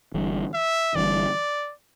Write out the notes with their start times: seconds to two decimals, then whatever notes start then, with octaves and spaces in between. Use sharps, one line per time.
0.14 G1 G2 E3
0.54 E5
0.95 G1 G2 E3 D5